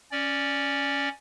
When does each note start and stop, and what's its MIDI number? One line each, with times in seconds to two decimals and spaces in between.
0.12 1.09 61
0.12 1.09 74